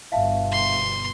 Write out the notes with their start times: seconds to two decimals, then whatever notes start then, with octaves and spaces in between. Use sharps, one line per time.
0.12 G1 G2 B2 E5 F5 A5
0.52 C6